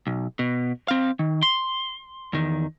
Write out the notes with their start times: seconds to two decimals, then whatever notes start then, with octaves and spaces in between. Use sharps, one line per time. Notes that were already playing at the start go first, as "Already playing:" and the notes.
0.07 B1
0.39 B2
0.88 C4 F5
1.19 D#3
1.43 C6
2.33 E2 D#3